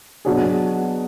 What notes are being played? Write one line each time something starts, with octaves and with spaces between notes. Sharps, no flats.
B2 F#3 D4 G#4